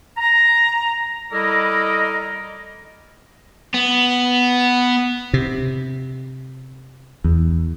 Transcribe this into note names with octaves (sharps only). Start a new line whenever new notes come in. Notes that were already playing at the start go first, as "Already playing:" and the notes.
A#5
G3 E4 A4 A#4 D5 D#5
B3
C3
E2